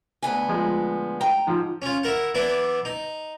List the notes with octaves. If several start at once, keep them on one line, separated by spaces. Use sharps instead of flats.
D2 B3 G#5
F3 G#3
G5 A#5
G#2 F3
C#4 F4
E4 A#4 F#5
E3 B3 D4 E4
D#4